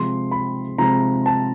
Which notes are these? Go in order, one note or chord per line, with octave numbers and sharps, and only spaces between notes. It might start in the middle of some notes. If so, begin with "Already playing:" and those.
Already playing: C3 F3 G#3 C6
B5
C3 F3 G#3 A#5
A5